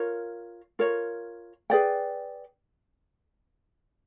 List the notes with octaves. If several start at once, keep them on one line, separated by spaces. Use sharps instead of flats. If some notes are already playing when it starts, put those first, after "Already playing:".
Already playing: F4 A#4 C#5
F4 A#4 C#5
G#4 B4 D5 G5